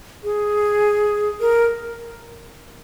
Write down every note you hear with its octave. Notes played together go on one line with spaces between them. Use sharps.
G#4
A#4